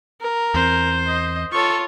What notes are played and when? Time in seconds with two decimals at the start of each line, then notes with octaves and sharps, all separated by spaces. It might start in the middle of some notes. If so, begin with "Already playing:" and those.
0.21 A#4
0.54 E2 C4 C5
1.07 D#5
1.52 F4 A4 C#5 C#6